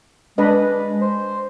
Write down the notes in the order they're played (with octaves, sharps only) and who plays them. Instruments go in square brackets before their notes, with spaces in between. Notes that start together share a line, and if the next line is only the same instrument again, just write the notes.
[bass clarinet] G#3 [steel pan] D4 B4 D#5
[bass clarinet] C5